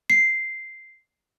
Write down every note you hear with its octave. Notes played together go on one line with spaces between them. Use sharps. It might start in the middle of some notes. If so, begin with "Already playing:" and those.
C7